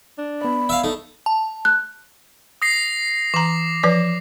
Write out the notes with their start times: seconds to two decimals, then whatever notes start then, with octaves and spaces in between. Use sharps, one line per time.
0.18 D4
0.42 B3 D5 B5
0.69 E5 F5
0.84 A3 D#4
1.26 A5
1.65 F#6
2.62 D#6 A#6 C7
3.34 E3 A#5 D6
3.83 F3 B4 D5